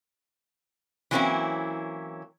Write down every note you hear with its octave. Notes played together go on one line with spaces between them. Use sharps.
E3 F#3 A#3 C4 C#4 E4